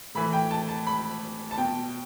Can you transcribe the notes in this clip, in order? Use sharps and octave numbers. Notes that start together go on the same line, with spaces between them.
A2 E3 B5
G5
A5
A5
B5
A5
B2 G5